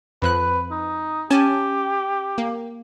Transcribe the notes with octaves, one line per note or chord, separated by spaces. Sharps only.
F2 F3 B4 F#6
D#4
C#4 G4 G#5 A5
A#3